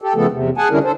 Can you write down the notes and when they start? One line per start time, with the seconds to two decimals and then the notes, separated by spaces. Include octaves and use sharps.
0.02 G4 A4
0.16 C#3 F3 A3 B3 A4
0.32 E2 C3
0.57 G#4 F#5 G#5 A5
0.71 D3 G3 C#4 D4 E4 A#4
0.84 D4 A4 C5